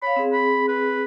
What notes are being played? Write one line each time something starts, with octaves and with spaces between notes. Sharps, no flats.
C#5 F5 B5
C4 G#4
B5
B4